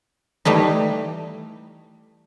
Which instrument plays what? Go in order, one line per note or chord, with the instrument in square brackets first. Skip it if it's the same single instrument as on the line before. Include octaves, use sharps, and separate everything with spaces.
[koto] E3 G3 A3 D#4